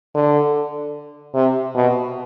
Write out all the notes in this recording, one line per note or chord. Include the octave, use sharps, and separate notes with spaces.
D3
C3
B2